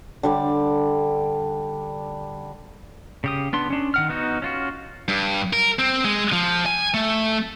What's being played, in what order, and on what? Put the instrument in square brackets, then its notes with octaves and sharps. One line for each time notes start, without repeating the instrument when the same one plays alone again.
[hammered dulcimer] D3 G3 D5
[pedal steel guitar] C#3 G4 D#6
B3 D4 C6
C#4 D4
D#3 F#5 F6
B3 D#4 F#4
C#4 F4 F#4
[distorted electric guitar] G2
A#4
C4
G#3
F3
G#5
A3